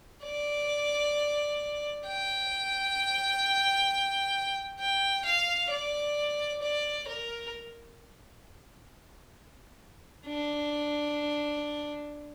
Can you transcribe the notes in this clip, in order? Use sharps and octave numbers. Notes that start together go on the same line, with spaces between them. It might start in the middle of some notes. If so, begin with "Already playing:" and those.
D5
G5
G5
F5
D5
D5
A#4
D4